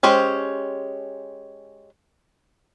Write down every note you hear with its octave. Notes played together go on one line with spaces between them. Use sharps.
G#3 C#4 G4 C5